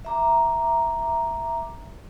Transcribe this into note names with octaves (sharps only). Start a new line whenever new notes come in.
E5 A#5 D6